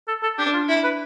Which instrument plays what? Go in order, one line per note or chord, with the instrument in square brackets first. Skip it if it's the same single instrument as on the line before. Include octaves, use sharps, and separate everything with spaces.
[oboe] A4
A4
[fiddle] D4 [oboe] G4
[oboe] F4
[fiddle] E4
[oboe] B4